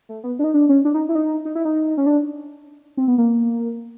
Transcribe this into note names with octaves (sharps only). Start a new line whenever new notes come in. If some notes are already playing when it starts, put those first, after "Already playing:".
A3
B3
D4
D#4
D4
C#4
D4
D#4
E4
D#4
D#4
E4
D#4
C#4
D4
C4
B3
A#3